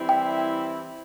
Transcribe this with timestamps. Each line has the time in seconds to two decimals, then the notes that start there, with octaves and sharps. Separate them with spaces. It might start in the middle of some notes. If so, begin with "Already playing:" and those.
Already playing: E3 G3 C4 E4
0.09 G5